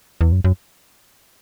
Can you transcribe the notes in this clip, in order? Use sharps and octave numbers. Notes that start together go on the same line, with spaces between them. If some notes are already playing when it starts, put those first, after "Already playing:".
E2
F#2
F#2